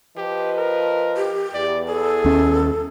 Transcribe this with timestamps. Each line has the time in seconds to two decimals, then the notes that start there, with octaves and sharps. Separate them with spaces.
0.18 F3 G4 B4 D#5
0.58 A#4
1.17 G4
1.54 E2 D5
1.88 G#4 A4
2.25 D#2 C#4